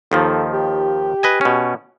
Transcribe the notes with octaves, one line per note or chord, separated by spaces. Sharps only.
D#2 D#3 F3 A4
G4
B4 D#5 G#5
B2 C#4